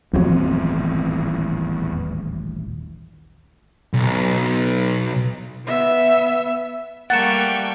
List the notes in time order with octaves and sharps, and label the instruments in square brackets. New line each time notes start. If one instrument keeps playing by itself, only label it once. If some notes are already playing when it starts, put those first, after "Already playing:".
[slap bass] D#1 A1 G#2 [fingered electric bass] E2 C4 [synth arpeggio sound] F3 F#3
[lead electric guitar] B1
[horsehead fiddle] B3 E5
[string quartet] G3 A3 A#3 [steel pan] F#5 [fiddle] G5 C#6 [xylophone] A6 E7